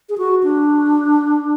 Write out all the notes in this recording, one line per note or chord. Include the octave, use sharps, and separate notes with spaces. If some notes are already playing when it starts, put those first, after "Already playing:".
G#4
F#4
D4